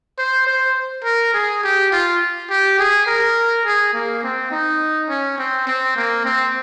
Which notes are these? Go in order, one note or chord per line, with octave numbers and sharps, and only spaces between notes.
C5
C5
A#4
G#4
G4
F4
G4
G#4
A#4
G#4
A#3
C4
D#4
C#4
C4
C4
A#3
C4